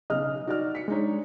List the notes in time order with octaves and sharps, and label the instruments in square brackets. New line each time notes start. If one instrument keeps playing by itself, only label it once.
[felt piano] B1 C#3 F6 [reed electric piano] D#5
[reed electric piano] D#4 [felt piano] F#4 D5 F6
[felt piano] B6 C#7
[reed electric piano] G#3 [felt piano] D4 D#4 C#5